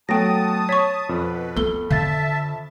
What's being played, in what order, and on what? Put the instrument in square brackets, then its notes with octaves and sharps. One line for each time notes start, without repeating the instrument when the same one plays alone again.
[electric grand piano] F#3 A3 B3 [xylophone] G5 A#6 [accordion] A5 D#6
[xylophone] C#5 C#6 [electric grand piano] B6
[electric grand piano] F2 [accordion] B2 B4
[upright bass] B3 [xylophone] A4 G7
[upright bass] D3 [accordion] E5 A5 [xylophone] F5 A6